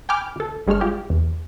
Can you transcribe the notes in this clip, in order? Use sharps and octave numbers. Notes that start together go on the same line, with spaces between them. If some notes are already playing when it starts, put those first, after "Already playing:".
G5 G#5 B5 D6 F6 G6
D2 A4
G1 G3 G#3 D4 C#5 F6
F4 G4 G#4
E2